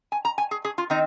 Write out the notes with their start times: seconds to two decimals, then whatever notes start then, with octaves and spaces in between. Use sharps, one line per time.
0.12 G#5
0.25 A#5
0.38 G#5
0.51 G#4
0.65 G#4
0.78 F4
0.90 D#3 C4 D#4